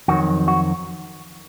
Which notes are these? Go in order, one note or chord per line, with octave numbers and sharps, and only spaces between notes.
F2 D#3 F#3 F#4
F#4